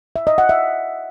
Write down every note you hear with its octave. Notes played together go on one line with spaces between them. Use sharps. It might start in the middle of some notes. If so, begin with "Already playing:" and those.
E5
D#5
F#5
E5